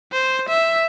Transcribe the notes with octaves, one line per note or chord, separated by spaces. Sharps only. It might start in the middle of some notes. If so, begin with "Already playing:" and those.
C5
E5